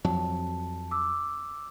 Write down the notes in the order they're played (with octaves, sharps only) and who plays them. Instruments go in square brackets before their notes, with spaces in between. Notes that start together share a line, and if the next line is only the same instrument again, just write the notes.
[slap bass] F2 F#3 [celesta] A5
[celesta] D6 E6